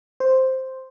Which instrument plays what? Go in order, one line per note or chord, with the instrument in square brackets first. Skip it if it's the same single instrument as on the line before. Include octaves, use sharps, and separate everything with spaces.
[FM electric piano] C5